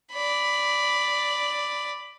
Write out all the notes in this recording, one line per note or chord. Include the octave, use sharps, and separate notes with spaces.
D5 B5